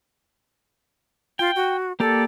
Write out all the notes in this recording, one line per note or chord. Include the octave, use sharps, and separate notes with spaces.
F4 G5
F#4
A#3 G4 A4 D5